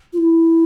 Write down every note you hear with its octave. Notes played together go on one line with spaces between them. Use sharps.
F4
E4